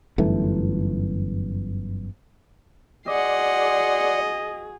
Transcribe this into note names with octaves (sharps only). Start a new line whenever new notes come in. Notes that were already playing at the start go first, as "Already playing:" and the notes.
G1 F#2 E3 A3
F#4 G#4 D5 D#5 F#5 C6